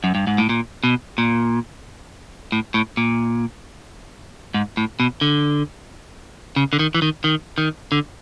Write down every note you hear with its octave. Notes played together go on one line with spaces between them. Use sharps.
F#2
G2
G#2
A2
A#2
B2
A#2
A2
A2
A#2
G#2
A2
B2
D3
C#3
D3
D#3
E3
D#3
D#3
D#3
D3